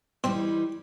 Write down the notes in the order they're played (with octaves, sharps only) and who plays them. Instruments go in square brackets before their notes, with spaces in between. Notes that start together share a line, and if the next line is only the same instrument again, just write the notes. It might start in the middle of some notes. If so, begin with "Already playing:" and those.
[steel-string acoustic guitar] E3 G3 D#4 [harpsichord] C4